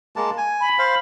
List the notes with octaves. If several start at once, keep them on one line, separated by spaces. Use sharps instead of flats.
G#3 A#3 A5
G#5
B5
C5 F5